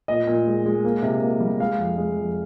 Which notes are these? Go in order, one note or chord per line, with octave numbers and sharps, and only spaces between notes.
A#2 D#5
A#2
G#3
G#3
A#3
C3
A#3
G3
G#3 F5
F2
G#3
F2